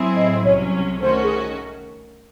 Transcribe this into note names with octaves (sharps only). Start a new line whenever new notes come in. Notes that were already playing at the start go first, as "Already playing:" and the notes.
Already playing: A2 F#3 C4 E4 G#4
D#5
C2 C3 F#3 C#4 C#5
D#3 A3 C#4 F#4 C5
G#4